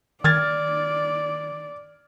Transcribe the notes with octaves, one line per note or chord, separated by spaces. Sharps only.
D#3 D5 F6 G#6 A6